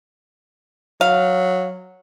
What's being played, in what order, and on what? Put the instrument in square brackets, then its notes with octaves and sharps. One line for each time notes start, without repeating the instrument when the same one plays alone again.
[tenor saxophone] F#3 [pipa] F5